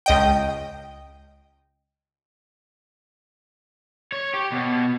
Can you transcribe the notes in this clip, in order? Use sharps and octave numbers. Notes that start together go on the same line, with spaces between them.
C#2 D#5 G5
C#5
G4
B2